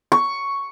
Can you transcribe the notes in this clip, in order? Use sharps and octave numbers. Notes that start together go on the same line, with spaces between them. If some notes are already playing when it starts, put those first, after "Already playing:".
C#6